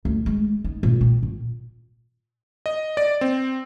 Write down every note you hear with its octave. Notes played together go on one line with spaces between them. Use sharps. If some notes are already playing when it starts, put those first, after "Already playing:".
D2
G#3
D#4
A#2
C4
A#2
D#5
D5
C4